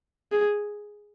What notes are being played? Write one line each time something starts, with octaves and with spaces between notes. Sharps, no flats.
G#4